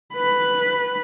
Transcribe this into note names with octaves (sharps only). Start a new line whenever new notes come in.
B4 B5